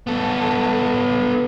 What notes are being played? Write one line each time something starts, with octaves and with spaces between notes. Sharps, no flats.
B3 A4